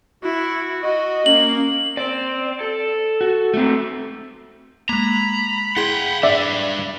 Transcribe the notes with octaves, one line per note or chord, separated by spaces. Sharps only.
E4 F#4
F#4 D#5
A#3 C#4 F#7
C4 D5
A4
F#4
A3 C4
G#3 A#3 A#5 B5
E4 G#4 F#5 G5 C6
D4 B4 D5 E5